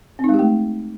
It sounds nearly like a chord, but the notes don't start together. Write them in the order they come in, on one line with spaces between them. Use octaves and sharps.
C4 D#4 G#3 G4 A3